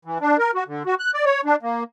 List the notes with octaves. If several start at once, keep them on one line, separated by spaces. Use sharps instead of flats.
E3
D4
A#4
F#4
D3
F#4
F#6
D5
C#5
D4
A#3